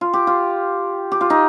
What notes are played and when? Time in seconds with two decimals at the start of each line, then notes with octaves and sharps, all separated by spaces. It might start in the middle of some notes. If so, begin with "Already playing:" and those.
0.01 F4
0.13 G4
0.27 F4
1.11 G4
1.21 F4
1.30 D#4